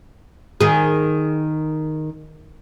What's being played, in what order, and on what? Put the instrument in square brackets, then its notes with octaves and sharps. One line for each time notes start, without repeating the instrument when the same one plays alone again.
[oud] D#3 G#4